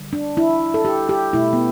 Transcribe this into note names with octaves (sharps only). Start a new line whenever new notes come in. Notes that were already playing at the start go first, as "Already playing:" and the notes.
Already playing: D3 G3
D4
E4
A4
G4
G4
B2 A3 E4
B3